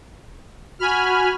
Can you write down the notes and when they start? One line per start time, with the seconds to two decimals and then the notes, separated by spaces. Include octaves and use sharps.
0.79 F#4 G#5 B5 F6